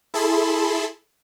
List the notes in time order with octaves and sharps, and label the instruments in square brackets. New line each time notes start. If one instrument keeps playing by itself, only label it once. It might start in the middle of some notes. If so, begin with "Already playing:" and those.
[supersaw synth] E4 G#4 A4 A5 B5 C6